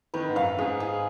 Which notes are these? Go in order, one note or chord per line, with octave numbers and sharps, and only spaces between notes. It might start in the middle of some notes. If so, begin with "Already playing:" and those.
D#3 B4
G#2
F#2 F5
G#2 G#4
G#4